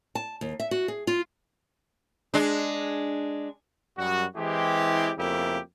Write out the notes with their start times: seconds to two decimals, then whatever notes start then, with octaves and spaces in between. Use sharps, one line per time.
0.15 A5
0.41 D#2
0.60 E5
0.71 F#4
0.88 G#4
1.07 F4
2.34 G#3 D4
3.97 F#2 G3 F#4
4.36 E3 G#3 C4 E4 G4
5.17 F2 C#3 A3 A#3 E4 G4